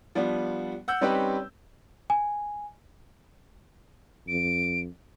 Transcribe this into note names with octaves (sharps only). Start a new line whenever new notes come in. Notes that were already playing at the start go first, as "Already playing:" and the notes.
F3 G3 B3 D4
F#5 E6 G6
G3 C4 C#4 D#4 G4 B4
G#5
F2 D7